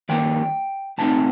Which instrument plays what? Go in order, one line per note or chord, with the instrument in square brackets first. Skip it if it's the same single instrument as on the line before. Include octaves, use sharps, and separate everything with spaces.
[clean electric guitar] G2 D#3 A#3 G5
C2 A#2 A3 C4 D#4 A5